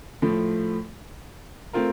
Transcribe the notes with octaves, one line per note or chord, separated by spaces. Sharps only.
A2 F3 A3
A3 C4 F4 A#4